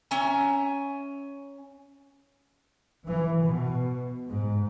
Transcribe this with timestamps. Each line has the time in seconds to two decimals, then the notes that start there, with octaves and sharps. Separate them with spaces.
0.11 C#4 E5 G#5 A#5
3.04 E3
3.40 B2
4.26 G#2